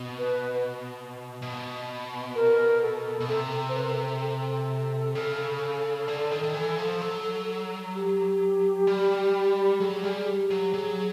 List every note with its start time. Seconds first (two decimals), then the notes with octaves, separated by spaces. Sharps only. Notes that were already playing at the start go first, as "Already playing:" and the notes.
Already playing: B2
0.18 B4
1.42 B2
2.35 A#4
2.82 A4
3.21 B2
3.28 C3 A4
3.68 C5
3.76 B4
3.83 A#4
3.90 A4
4.22 A4
5.15 C#3
6.08 D3
6.31 D#3
6.43 D#3
6.54 E3
6.78 F3
7.01 F#3
7.95 G4
8.87 G3
9.80 F#3 G#4
9.94 G4
10.04 G3 G#4
10.27 G4
10.51 F#3
10.74 F#3 G#4